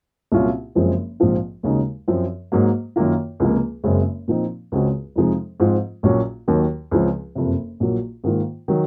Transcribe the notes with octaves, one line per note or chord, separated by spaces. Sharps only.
C2 A#2 F#3 C#4 F4
F#1 F#2 F3 G#3 C4
A#1 G#2 F3 C4 F4
D#2 C#3 G#3 D#4 F#4
F#2 F3 C4
G#2 F#3 A#3
F#2 D#3 A#3 F4
C#2 C3 F3 A#3
F#1 F#2 C#3 G#3 C4
A#2 F3 C4 D#4
C#2 C#3 G#3 C4 F#4
F2 C3 F3 G#3 D#4
G#2 F3 C4 F4
A#1 A#2 F#3 C#4 F#4
D#2 D#3 F#3
C#2 C#3 F3 C4
F#1 F2 C3
A#1 A#2 F#3 A#3
G#2 D#3 A#3 F4
D#3 F#3